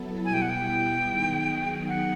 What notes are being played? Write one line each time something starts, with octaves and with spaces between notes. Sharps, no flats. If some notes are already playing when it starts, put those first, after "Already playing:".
Already playing: F#3 B3 E4 A4
B2 G3 B3 E4 G#5
G5
F#5
G5
D#3 F#3 B3 D#4 G#4
F#5